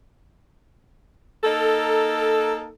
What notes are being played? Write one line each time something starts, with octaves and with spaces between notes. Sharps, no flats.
A#3 D#4 A4